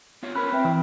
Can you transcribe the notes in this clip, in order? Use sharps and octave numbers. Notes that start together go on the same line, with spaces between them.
B3 F4 C#5
C#4 A#4 B4 C#5 B5 F6 F#6
C4 B4 E5 G5
E3